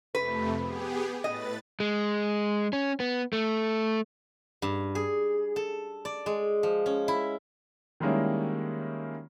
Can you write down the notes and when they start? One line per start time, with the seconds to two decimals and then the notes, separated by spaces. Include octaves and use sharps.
0.15 F2 C3 A3 B4
0.61 B3 G4 G#4
1.24 A2 B4 D#5 A6
1.80 G#3
2.73 C#4
3.00 B3
3.33 A3
4.62 G2
4.95 G#4
5.56 A4
6.05 D5
6.26 G#3
6.63 F3
6.86 C#4
7.08 E4
8.00 D#3 G3 G#3 A#3 C#4 E4